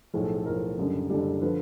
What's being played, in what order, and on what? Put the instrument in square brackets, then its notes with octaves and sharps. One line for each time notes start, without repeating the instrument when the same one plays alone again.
[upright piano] B1 A2 F3 G#4
A4
A4
B1 A2 F3 A#4
F#1 F#2 D3 G3
F#1 F#2 D3 G3
D3 F3 B4